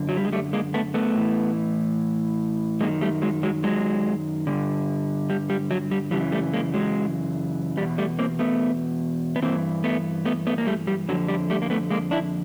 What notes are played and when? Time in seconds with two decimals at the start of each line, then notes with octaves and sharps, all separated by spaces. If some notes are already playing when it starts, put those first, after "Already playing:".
Already playing: F#2 D3
0.09 F#3
0.17 G3
0.25 G#3
0.32 G3 A3
0.53 G#3 A#3
0.74 A3 B3
0.94 A3 B3
1.15 A2 E3
2.81 F#2 D#3 G#3 A#3
3.01 G3 A3
3.22 F#3 G#3
3.43 F#3 G#3
3.64 F#3 G#3
4.47 G2 D3
5.30 G3
5.50 G3
5.71 F#3
5.91 G3
6.11 F#2 C#3 E3 G3
6.32 G3 A3
6.54 G#3 A#3
6.74 F#3 G#3
7.77 E2 B2 G3
7.98 G3 A3
8.19 A#3 C4
8.39 A3 B3
9.36 B3
9.42 G2 E3 A#3 C4
9.84 A3 B3
10.25 A3 B3
10.47 A3 B3
10.58 A#3
10.67 G3 A3
10.87 G3
11.09 F2 D3 F#3
11.28 G3
11.50 G3 A3
11.62 A#3
11.70 A3 B3
11.90 G#3 A#3
12.11 D4 E4